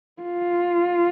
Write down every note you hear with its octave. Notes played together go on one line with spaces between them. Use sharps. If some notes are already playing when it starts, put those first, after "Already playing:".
F4